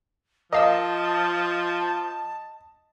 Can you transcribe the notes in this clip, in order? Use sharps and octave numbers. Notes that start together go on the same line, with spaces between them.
F3 A#4 D#5 F5 A5 E6